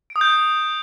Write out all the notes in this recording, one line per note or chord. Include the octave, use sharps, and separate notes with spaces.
D7
D#6
G6